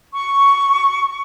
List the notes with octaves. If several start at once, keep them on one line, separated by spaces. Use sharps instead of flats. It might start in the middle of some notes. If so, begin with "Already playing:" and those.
C#6